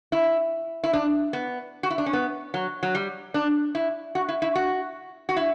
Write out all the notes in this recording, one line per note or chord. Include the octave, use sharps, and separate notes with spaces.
E4
E4
D4
B3
F#4
E4
D4
C#4
B3
F#3
F#3
G3
D4
E4
F#4
E4
E4
F#4
F#4
E4